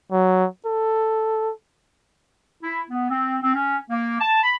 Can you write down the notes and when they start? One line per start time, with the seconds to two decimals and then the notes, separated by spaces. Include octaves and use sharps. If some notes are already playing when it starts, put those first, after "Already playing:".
0.12 F#3
0.66 A4
2.62 E4
2.90 B3
3.10 C4
3.42 C4
3.55 C#4
3.90 A#3
4.20 A5
4.42 B5